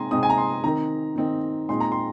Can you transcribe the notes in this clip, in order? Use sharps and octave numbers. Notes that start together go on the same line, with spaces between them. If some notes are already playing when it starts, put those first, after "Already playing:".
Already playing: C3 G#3 C4 D#4 G#5 A#5 C6
C3 G#3 C4 D#4 D#6
G#5
A#5
C6
D#3 C4 D#4 A#5
D#3 C4 D#4
A#2 G#3 C4 D#4 C6
A#5
C6